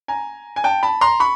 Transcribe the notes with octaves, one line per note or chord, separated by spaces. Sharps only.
G#5 A#5
G#5
G5 A5
A5 B5
A#5 C6
B5 C#6